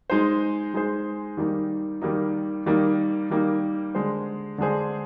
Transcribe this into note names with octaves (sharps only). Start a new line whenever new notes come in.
G#3 D#4 G#4 C5
G#3 D#4 G#4 C5
D#3 G3 A#3 D#4
D#3 G3 A#3 D#4
D#3 G3 A#3 D#4
D#3 G3 A#3 D#4
D3 G#3 D4 G#4 C5
D3 G#3 D4 G#4 C5